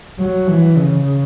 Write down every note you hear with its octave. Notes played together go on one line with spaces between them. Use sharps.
F#3
E3
C#3